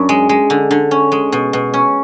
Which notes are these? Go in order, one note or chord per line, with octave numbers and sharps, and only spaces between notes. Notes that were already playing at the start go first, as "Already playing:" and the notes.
Already playing: F#2 D4
G#3
G#3
D3
D3
C#4
G#3
B2
B2
C#4